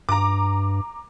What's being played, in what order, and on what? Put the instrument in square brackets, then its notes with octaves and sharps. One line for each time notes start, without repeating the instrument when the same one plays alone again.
[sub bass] G2 [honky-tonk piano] A#5 D6